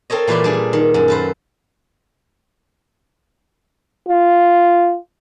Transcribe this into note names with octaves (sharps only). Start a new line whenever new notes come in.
C4 A4 A#4 C#5 D#5
A#2 E3 G3 B4 D5 C6
G3 D4 G#4
D#3
F#2
A4 B4 C5
F4